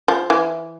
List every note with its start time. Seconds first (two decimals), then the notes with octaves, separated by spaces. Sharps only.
0.08 F3
0.30 E3